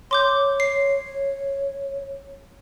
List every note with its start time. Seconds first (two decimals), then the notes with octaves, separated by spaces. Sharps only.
0.11 C#5 C6 D6 G6
0.60 C7